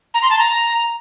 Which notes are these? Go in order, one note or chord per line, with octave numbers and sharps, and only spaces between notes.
A#5
C6
A5
A#5